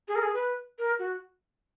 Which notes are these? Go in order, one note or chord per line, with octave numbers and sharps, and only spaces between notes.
G#4
A#4
G#4
B4
A#4
F#4